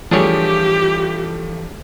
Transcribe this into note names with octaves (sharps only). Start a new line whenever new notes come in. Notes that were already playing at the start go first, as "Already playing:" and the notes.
E3 F3 G3 A3 D4 G4 G#4 C#5